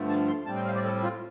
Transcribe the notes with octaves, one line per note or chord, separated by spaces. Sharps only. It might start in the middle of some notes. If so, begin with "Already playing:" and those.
Already playing: G2 D3 F3 A3
A5
C6
A2 G3 C4 A5
G5
F5
D5
A4
F4